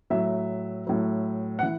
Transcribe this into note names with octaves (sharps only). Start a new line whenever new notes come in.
A2 F#3 E5
A2 F#3
F#5
E3